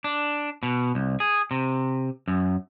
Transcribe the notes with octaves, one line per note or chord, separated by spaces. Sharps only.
D4
B2
C2
G#4
C3
F#2